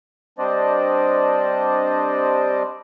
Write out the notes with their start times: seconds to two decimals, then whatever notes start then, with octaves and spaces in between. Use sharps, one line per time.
0.39 G3 C4 D4 C5 D5 D#5